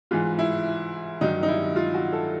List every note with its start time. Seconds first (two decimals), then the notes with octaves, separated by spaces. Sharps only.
0.11 G#2 E3 F4
0.39 E4
1.21 G2 D#3 F#3 D#4
1.43 D#4
1.48 E4
1.76 F4
1.94 F#4
2.13 A4